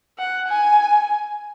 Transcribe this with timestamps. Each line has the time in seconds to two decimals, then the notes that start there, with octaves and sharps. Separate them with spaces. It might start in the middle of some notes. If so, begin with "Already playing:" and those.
0.19 F#5
0.48 G#5